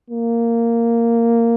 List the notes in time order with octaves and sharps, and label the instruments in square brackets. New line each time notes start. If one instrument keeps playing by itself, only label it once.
[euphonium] A#3